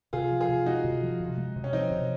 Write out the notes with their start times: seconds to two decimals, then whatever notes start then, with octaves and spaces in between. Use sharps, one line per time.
0.13 C3 F4 G#4
0.31 F3
0.40 F4 G#4
0.49 C3
0.66 G#3 D#4 F#4
0.84 C3
1.03 F3
1.20 C3
1.38 G#3
1.56 C3
1.64 C#4
1.73 F3 C4 D#4
1.91 C3